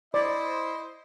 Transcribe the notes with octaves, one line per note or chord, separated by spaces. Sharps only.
E4 C5 D5 D#5